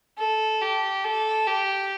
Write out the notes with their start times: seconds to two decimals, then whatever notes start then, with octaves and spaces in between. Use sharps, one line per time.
0.18 A4
0.62 G4
1.04 A4
1.47 G4